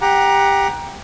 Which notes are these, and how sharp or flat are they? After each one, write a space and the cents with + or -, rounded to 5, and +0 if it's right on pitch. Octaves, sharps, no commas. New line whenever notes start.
G4 +15 F#5 +0 A#5 +15